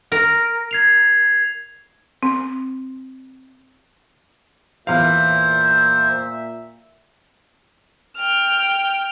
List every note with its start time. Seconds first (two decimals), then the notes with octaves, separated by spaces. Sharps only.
0.12 A#4
0.71 G#6 C7 F7
2.23 C4
4.87 E2 A#2 C5 E5 F5
8.16 G5 F6